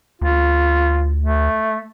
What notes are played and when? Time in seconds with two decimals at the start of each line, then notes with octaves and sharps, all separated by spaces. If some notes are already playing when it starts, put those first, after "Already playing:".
0.22 D2 F4
1.22 A3